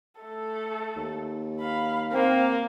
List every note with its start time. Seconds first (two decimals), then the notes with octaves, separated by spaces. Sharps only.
0.21 A3 A4
0.96 D#2
1.60 F5 B5
2.13 A#3 C4 F5